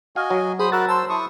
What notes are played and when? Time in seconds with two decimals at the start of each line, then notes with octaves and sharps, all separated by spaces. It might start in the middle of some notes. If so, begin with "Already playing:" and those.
0.16 F#4 D#5 F5 G#5
0.30 F#3
0.59 G#4 C5 B5 D#6
0.72 F#4 A#4 F#5 B5 E6 A6
0.89 C5 A5 C6 E6
1.10 E4 C#6 D#6